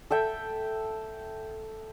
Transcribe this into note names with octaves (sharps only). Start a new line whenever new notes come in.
A4 E5 G5